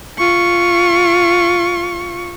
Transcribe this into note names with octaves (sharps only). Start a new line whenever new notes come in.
F4 C#6